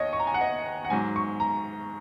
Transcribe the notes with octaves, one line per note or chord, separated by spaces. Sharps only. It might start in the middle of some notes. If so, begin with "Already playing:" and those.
Already playing: D#2 C#5 D#5
C#6
A#5
G#5
F#5
D#5
F#5
G#2 F#3 G#5
C#6
A#5